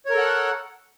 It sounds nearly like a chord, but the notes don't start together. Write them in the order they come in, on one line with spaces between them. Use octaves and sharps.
C#5 A#4 A4 F#5